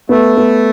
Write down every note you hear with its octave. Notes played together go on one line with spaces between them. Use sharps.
A3 B3
B3